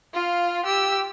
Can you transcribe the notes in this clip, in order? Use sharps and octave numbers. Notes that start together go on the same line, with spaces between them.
F4 F5
G4 E6